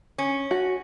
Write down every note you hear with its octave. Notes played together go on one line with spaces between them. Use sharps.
C#4
F#4